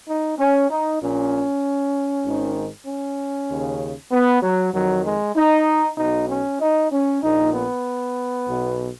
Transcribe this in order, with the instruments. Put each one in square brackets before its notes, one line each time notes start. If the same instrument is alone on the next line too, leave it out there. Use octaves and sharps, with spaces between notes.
[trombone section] D#4
C#4
D#4
A#1 A#2 C#4
G#1 G#2 D#3
C#4
D#2 C#3
B3
F#3
F2 D#3 F#3
G#3
D#4
B1 B2 D#4
C#4
D#4
C#4
A#1 A#2 D#4
B3
B1 B2